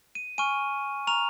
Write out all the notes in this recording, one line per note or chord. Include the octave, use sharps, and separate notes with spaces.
D#7
G#5 C#6 F6 D#7
A#5 C#6 F6 F7